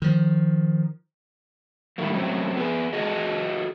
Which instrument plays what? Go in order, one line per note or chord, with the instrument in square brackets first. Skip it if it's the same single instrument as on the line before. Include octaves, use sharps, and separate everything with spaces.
[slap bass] D#3 F3
[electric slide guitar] A2 D#3 G3 A3 A#3
C3 F#3 A3 C4 C#4
B3 G#4
F#4 G#4 A4 D#5